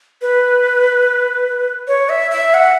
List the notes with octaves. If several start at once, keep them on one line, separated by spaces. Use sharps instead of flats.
B4
C#5
E5
E5
F#5